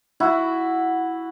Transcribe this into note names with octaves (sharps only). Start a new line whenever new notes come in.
E4 F#4